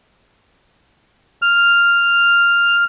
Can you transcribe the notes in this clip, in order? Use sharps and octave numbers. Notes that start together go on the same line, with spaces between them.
F6